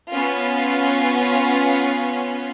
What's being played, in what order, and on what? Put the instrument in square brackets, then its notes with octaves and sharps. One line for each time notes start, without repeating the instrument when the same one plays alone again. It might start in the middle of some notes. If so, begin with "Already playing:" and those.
[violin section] B3 C#4 F4